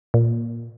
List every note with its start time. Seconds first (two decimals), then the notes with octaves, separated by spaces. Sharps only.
0.14 A#2